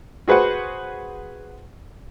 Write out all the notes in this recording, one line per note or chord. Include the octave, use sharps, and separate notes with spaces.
F#4 G#4 B4 C5 F#5